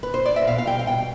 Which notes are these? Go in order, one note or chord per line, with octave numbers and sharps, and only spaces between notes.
B4
C5
D5
E5
B2 F5
F5
G3 G5
F5
B2 G5